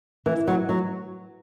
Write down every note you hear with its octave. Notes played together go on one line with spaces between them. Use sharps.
E3
F#3
F#3